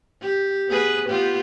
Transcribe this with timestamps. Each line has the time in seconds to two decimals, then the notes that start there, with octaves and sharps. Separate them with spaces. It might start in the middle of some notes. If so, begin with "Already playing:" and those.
0.22 G4
0.69 B3 G#4 B4
1.09 B3 F4 G4